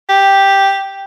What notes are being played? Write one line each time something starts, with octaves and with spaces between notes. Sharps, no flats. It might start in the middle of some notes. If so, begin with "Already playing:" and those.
G4